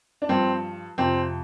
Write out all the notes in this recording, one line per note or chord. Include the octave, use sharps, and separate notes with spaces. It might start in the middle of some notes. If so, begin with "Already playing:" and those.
D4
G2 F3 C4
F2 C3 F3 C4